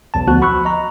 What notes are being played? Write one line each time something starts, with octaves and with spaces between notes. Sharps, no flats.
B1 E2 A5
D2 F3 B3 F#4 F#6
B5 C#6 E6 F#6
D#5 A#5